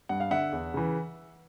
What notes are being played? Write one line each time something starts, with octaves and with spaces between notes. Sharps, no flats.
G2 F#5
F5
D3 E5 F#5
E2
C#3 E3